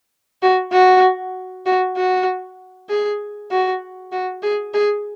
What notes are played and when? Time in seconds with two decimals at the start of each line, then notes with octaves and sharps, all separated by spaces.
0.42 F#4
0.72 F#4
1.66 F#4
1.97 F#4
2.89 G#4
3.51 F#4
4.12 F#4
4.43 G#4
4.74 G#4